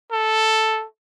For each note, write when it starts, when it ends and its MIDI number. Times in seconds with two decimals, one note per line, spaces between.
0.12 0.85 69